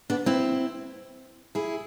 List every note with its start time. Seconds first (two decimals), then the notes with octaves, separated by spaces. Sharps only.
0.10 B3 D4
0.26 C4 E4
1.55 E4 G#4